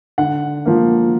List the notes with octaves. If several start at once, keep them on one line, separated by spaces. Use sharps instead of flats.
D3 F#5
F3 A#3